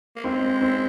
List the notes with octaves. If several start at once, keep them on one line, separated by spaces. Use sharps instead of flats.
A#3
G#3 C4
C4